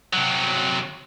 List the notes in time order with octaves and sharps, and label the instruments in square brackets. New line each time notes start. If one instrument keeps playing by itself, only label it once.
[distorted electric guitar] C3 F#3